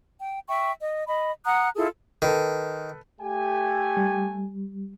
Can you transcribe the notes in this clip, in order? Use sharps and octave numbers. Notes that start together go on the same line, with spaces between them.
G5
E5 G5 C#6
D#5
D#5 B5
F#5 A#5 D#6 F#6
E4 F4 G#4 A4
D#3 A4 B4
A3 G4 G#5
G3